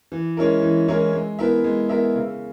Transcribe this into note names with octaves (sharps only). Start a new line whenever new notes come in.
E3
G#3 C#4 E4 A#4
E3
G#3 C#4 E4 A#4
G#3
B3 E4 A#4 E5
G#3
B3 E4 A#4 E5
C#3